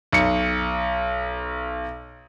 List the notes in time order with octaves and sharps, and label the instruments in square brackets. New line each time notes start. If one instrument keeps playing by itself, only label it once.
[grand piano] B1 C#7